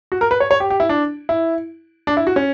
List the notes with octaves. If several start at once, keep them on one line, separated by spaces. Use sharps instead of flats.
F#4
A#4
B4
C#5
C#5
G4
G4
E4
D4
E4
D4
E4
F#4
C#4